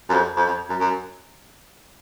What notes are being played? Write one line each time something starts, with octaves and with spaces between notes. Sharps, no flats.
F#2
F2
F2
F2
F#2
F#2